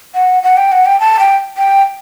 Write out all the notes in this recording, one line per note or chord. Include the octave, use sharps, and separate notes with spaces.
F#5
F#5
G5
F#5
G5
A5
G5
G5